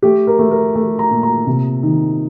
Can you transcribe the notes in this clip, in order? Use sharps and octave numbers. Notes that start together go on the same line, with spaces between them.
A3 G4
A#4
A3
A#4
A3
A#5
A#2
A#5
C3
D#3